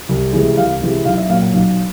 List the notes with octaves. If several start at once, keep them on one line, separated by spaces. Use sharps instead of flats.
C2
C3 E3 G#3
C2 F5
C3 E3 G#3
B1 F5
E5
A#2 F#3 F5
F#5
B1 F5